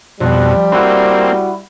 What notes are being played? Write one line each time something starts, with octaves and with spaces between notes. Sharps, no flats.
F2 B2 F3 G3
A#3 C4 E4 F#4